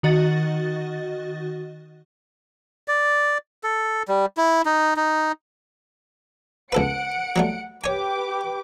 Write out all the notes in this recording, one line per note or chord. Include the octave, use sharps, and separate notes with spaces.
D#3 F#4 D#5 A6
D5
A4
G3
E4
D#4
D#4
C#2 A4 B4 F#5 C#7 D7
F#3 G3 A3
G4 B4 C#5 G#5 D6